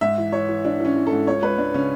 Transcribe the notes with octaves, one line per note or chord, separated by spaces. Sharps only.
G#2 E5
E3
E3 C#5
E3
E3 D4
E3 C#4
E3
A4
G#2
C#2 C#5
C#2 B4
C#2 D4
C#3 C#4